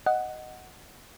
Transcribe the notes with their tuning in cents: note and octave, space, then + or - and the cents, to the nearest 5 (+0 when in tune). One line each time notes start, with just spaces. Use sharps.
D#5 +0 F#5 +5